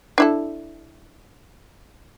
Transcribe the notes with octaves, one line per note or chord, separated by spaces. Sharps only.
D4 E4 A4